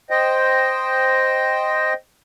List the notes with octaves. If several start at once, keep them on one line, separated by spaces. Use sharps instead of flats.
C5 D#5 G5